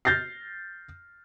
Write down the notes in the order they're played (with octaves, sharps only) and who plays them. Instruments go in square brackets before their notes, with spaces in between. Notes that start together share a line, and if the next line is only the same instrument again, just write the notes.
[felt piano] F6 G6 A6 A#6 C7